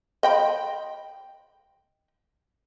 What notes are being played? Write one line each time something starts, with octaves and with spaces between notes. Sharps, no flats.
D#5 G5 B5